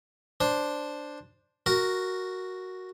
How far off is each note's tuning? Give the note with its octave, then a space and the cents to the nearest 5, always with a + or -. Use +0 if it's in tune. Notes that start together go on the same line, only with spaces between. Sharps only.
D4 +0 C5 +0
F#4 +0 A#4 +0